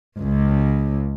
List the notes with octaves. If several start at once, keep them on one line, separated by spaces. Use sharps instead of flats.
C#2